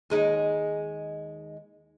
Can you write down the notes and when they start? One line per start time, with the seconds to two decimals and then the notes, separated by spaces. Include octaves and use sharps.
0.10 D#2 G#3 D#4